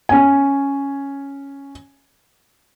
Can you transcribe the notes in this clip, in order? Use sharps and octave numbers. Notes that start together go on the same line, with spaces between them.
C#4 G#5